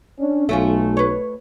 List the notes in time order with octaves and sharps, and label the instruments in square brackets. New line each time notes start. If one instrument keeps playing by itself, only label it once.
[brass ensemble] C#4 D4
[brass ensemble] B1 [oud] A3 C#4 F4
[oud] B4 C#5